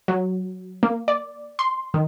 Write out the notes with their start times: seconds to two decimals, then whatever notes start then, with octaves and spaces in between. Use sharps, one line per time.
0.08 F#3
0.83 A#3
1.08 D5
1.59 C6
1.94 D#3